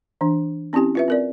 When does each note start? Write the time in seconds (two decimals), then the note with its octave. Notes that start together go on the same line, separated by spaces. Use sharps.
0.21 E3 D4
0.73 C4 C#4 E4 G4 G#5
0.95 F4 B4 E5
1.08 C4 A#4 D5